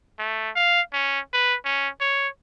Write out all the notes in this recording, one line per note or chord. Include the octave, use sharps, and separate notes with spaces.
A3
F5
C#4
B4
C#4
C#5